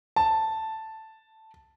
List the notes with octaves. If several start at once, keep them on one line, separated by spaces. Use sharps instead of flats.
A5